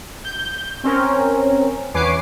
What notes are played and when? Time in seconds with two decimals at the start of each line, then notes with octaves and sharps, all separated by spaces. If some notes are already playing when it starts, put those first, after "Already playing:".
0.25 G6
0.84 C4 C#4 A#4
1.94 E2 B4 C#5 G#5 D6 C7